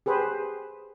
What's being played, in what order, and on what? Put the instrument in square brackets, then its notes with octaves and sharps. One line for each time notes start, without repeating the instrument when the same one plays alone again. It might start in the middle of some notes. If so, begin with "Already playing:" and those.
[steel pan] G4 G#4 B4 C5